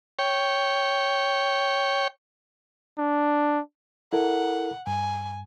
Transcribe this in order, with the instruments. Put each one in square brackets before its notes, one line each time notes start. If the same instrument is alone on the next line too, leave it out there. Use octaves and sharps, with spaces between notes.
[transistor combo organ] C#5 G5
[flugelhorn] D4
[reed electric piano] E4 A4 A#4 [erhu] F#5
[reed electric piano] G2 [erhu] G#5